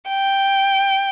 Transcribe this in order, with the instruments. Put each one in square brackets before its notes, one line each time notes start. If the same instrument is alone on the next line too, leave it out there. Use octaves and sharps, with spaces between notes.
[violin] G5